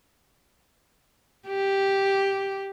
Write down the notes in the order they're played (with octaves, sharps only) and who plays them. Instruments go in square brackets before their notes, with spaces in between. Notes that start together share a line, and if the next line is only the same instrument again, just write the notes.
[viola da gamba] G4